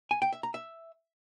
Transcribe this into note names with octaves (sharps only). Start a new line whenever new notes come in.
G#5
G5
E5
A#5
E5